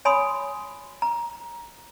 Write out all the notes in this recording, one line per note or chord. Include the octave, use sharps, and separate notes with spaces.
C#5 G#5 B5 C6 D#6
A#5